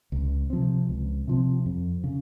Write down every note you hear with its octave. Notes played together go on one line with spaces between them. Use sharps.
C#2
C3 F3 C4
C#2
C3 F3 C4
F2
C#3